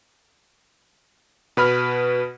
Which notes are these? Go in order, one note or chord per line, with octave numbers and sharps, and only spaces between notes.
B2 B4 B5 F6